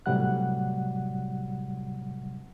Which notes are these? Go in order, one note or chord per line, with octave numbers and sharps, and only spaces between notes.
A2 C3 F#3 G3 F#5 F#6